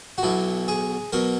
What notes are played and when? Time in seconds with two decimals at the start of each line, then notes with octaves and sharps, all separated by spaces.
0.18 F#4
0.23 B1 B2 F#3 E4
0.68 G#4
1.12 B2 F#3 A#4